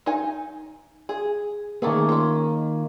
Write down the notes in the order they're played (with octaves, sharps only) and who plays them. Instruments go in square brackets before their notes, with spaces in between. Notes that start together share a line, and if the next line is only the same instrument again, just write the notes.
[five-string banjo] D#4 G#5
G#4
[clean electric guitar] D#3 A#3 [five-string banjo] A3 C#4 G#4
[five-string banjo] C#4 F4